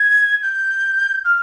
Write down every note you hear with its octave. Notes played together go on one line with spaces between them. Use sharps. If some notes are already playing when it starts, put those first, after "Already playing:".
Already playing: G#6
G6
F6